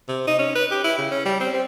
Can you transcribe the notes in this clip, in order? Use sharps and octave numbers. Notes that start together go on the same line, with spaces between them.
C3
D#4
C#4
B4
G4
E4
C#3
C#4
G3
C4
C4